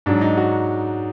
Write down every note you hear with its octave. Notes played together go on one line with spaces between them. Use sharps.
G#2 F#3 D4
D#4
F#4